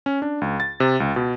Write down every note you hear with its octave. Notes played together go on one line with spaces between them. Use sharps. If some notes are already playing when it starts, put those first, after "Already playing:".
C#4
D4
C#2
A6
C3
C#2
B2